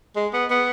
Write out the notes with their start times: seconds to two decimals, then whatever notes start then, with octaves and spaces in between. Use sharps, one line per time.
0.16 G#3
0.34 B3
0.51 B3